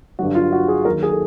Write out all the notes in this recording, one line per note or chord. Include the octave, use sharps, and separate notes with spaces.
G2 D3 F#3 F#4
F4
F#4
G#4
D#2 D#3 F#3 A#4
G#4
A4